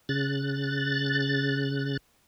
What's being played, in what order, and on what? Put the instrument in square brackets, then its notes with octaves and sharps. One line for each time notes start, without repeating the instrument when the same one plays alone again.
[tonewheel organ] C#3 F#6 A6